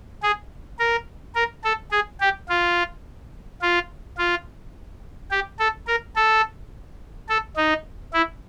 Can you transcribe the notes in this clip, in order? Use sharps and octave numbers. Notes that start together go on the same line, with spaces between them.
G#4
A#4
A#4
A4
G#4
G4
F4
F4
F4
G4
A4
A#4
A4
A4
D#4
E4